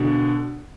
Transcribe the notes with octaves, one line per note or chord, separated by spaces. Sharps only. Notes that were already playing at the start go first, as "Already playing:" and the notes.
Already playing: B2 D3